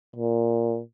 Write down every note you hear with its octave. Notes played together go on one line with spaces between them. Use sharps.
A#2